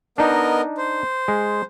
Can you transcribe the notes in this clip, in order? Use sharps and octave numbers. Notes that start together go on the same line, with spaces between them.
B3 D4 D#4 A#4 D#5
C5
G#3